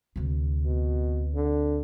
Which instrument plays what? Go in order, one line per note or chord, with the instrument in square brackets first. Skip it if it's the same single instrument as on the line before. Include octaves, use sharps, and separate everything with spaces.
[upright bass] D2 C3
[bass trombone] B2
D3